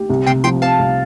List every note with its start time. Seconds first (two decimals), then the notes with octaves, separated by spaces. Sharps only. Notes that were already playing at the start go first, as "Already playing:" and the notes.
Already playing: G4
0.10 C2
0.27 C3 G5 C6
0.44 F3 G5 C6
0.62 C4 F5 A5
0.79 C2